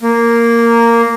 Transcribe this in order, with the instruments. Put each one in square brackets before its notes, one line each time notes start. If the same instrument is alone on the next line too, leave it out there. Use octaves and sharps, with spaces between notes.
[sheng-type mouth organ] A#3